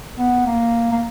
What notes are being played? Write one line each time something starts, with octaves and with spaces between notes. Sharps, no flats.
B3
A#3
A#3